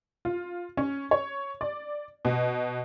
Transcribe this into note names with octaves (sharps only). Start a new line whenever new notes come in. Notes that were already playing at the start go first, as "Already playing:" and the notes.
F4
C#4
C#5
D5
B2